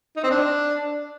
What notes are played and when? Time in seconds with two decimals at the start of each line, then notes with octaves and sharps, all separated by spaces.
0.16 D#4
0.24 C4
0.31 D4